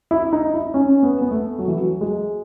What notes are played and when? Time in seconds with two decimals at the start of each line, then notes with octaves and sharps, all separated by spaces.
0.11 E4
0.33 D#4
0.54 E4
0.74 C#4
1.03 B3
1.21 B3
1.31 A3
1.59 F#3
1.68 E3
1.77 F#3
2.01 G#3